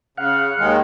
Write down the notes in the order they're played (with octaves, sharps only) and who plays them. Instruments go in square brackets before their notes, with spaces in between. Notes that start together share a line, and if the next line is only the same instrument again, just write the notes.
[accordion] C#3 [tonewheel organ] F5 F#5
[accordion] D#2 D#3 G#3